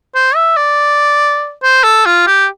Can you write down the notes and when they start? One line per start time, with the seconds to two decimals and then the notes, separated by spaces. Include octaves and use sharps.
0.15 C5
0.36 E5
0.57 D5
1.63 C5
1.84 A4
2.06 F4
2.27 G4